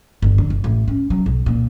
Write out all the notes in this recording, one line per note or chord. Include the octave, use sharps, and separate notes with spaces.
G1
D3
G1
A1
C#4
F#3
B1
A#2